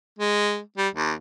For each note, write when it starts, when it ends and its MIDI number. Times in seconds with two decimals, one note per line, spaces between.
0.18 0.60 56
0.77 0.88 55
0.94 1.12 39